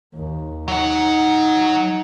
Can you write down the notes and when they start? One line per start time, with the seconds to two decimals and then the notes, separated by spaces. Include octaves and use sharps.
0.14 D#2
0.68 F#3 D#4 F#5